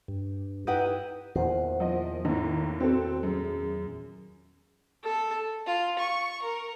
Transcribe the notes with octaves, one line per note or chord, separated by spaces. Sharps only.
G2
D#4 E4 G4 B4 F#5
E2 A#2 D#3 A#4 C5 F#5
F3 D#5
D#2 A2 A#5
C4 F#4 A4
F#2 G#4
A4
F4
C#6
A#4